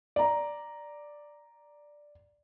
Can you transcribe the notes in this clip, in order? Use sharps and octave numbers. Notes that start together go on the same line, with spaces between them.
D5 A#5